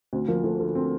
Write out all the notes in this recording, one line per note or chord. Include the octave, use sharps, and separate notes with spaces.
D2 C4
F3 A#3
F3 A3
D3 A3
C4